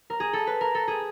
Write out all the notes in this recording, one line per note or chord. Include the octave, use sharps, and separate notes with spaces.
A#4
G#4
A4
B4
A#4
A4
G#4